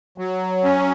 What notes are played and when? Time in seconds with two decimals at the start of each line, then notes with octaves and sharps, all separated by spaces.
0.18 F#3
0.64 C#4